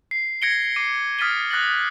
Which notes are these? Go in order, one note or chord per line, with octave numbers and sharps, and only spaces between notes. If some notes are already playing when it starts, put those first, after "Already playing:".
C7
G#6 A#6 C#7 D7 G7
D6 C7 D#7
D#6 F6 A6 B6 D#7 G7
D#6 F#6 A6 A#6 F#7